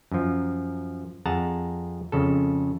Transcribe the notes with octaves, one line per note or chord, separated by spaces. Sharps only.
F#2 F3
F2 G#4 F#5 A5 A#5
F2 C#3 A4